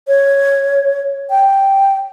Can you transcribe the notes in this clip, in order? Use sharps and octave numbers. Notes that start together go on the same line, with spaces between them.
C#5
G5